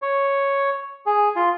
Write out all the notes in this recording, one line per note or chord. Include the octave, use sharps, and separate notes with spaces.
C#5
G#4
F4